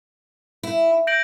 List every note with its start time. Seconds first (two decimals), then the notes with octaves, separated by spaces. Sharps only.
0.63 E4
1.07 G6 A#6 D7 F#7